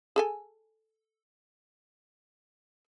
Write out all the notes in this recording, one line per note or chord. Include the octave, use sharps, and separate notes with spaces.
G#4 A4 G#5